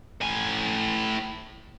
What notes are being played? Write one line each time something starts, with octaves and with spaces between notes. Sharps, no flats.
A2 G#5